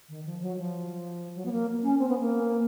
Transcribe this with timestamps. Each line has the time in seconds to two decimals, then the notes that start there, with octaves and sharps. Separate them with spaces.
0.09 D#3
0.25 F3
0.41 F#3
0.57 F3
1.35 F#3
1.45 B3
1.52 A#3
1.83 C#4
1.99 C4
2.09 B3
2.20 A#3